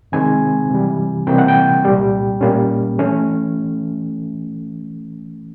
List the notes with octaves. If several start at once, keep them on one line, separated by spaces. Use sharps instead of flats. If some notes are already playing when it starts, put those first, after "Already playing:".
C3 D#3 G#3 C4 G#5
C3 E3 G3
C3 E3 G3 A#3 G5
F#5
G5
C2 A#2 G3
A#2 G3 A#3 C#4
E3 A3 C#4